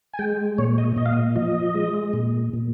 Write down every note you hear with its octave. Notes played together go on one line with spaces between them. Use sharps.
G#5
G#3 G5
A#2 C#5
D#5
A#2 D#5
F5
D#5
F3 D#5
G#3
A#2
A#2